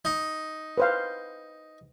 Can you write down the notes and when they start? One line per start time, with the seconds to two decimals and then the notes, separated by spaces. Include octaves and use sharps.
0.05 D#4
0.78 B4 C5 F5